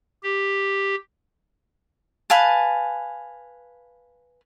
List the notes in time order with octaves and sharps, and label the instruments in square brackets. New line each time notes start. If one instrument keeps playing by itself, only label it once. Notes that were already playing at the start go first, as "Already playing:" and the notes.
[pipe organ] G4
[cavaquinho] B4 F5 G#5 A5